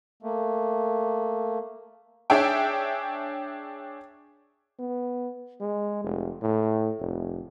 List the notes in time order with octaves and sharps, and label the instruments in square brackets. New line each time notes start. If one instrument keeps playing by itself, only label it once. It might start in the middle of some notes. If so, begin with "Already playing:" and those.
[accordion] A3 A#3
[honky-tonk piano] D4 G#4 C#5 E5 G5
[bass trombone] B3
G#3
F1
A2
F1